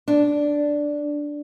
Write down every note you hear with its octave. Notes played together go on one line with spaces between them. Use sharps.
D4